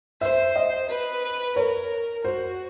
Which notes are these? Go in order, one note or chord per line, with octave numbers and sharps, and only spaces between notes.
C5 E5
D#5
B4
A#4 C#5
F#4 C5